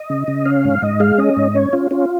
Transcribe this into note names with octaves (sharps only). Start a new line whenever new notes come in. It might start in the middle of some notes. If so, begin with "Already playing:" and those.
Already playing: D#5
C#3
C#3
C#4 F5
G#2
G#2 D#5
G#3 F5
C#4 D#5
G#2
C#4 C#5
C#4 F4
C#4 F4